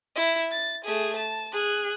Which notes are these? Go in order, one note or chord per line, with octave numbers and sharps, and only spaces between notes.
E4
A6
A3 G#4
A5
G#4 F#6